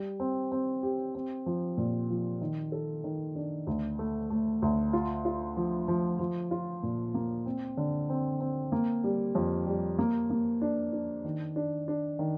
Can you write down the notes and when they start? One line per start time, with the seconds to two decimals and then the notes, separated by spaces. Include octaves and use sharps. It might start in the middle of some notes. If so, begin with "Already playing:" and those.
Already playing: G3
0.20 C4
0.52 C4
0.83 G4
1.15 C4
1.46 F3
1.77 A#2
2.10 F3
2.41 D#3
2.72 A4
3.04 D#3
3.35 D4
3.67 D2
3.99 A3
4.30 A3
4.62 D2
4.93 F4
5.25 F4
5.57 F3
5.88 F3
6.19 F3
6.51 F4
6.83 A#2
7.14 A#3
7.46 C4
7.77 D3
8.10 C4
8.41 C4
8.72 A#3
9.04 G3
9.35 F2
9.67 G3
9.98 A#3
10.30 A#3
10.62 D4
10.93 D4
11.24 D#3
11.56 D4
11.88 D4
12.19 D#3